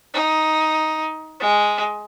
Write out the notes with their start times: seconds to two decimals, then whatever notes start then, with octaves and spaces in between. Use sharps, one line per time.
0.14 D#4
1.40 G#3